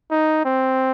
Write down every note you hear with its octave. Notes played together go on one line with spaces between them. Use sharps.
D#4
C4